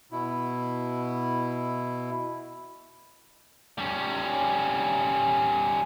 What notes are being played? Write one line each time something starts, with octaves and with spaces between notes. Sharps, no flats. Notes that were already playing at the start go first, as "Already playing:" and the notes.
B2 E4
G3 C#4